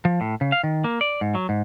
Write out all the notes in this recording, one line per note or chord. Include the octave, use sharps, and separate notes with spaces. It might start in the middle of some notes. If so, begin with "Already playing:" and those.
F3
A2
C#3
F5
D#3
A#3
D5
G#2
F#3
G#2